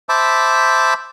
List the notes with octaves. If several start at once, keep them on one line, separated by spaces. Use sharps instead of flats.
C5 E5 A5 B5 D6